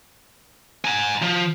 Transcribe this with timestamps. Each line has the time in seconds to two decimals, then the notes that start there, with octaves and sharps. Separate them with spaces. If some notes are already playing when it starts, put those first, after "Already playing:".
0.85 G#5 A#5
1.22 F3